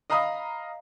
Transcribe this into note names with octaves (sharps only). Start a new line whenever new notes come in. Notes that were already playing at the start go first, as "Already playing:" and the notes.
D#5 F5 A#5 B5 D#6